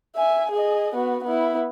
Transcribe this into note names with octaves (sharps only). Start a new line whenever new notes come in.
E5 G#5
G#4 D#5
B3 F#4
B3 E4